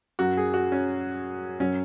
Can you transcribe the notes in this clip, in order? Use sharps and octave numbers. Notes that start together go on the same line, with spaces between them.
F#2 F#3 F#4
G#4
F#4
C#4
F#2 F#3 C#4